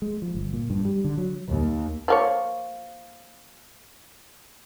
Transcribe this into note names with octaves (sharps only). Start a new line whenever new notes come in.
G#3
F3
G1
A#2
G2
G3
D3
F#3
D#2
F3 A#3 C#5